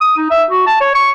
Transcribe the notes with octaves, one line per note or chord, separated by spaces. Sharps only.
D#6
D#4
E5
F#4
A5
C#5
C#6